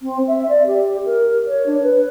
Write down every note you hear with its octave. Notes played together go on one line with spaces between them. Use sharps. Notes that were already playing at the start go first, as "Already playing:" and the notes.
C4
E5
D5
G4
A#4
C#5
D4
B4